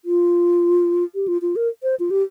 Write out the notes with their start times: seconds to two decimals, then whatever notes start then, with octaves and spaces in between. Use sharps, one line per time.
0.05 F4
1.15 G4
1.28 F4
1.42 F4
1.56 A#4
1.83 C5
2.00 F4
2.11 G4